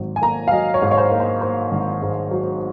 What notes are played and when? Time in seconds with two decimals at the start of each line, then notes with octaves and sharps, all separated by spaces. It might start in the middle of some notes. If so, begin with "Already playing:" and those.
Already playing: G#1 F#3
0.16 G#5
0.22 A#3 A#5
0.48 F5
0.52 F#3 D#5
0.74 C#5
0.82 G#2
0.91 C#5
0.98 C5
1.11 A#3
1.20 C5
1.41 A#3 C5
1.72 G#1
2.02 G#2
2.31 F#3